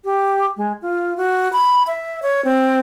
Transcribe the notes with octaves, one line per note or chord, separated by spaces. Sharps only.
G4
G#3
F4
F#4
B5
E5
C#5
C4